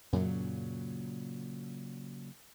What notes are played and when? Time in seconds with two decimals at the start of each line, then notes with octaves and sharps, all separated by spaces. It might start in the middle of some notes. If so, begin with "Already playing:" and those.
0.13 F#2 A#2 C#3 F#3